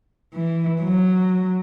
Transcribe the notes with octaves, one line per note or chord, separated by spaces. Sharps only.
E3
F#3